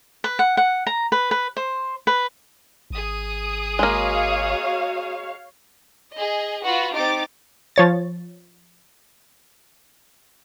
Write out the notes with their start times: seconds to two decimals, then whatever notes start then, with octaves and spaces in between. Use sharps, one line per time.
0.24 B4
0.39 F#5
0.57 F#5
0.87 A#5
1.12 B4
1.31 B4
1.57 C5
2.07 B4
2.90 G#1 G#4 D#6
3.79 G#3 A#3 F#4 C#5 F5
6.15 G#4 D#5
6.65 F4 F#4 B4 F#5
6.96 C4 D#4 G4 D6 A6
7.76 F3 C#5 A6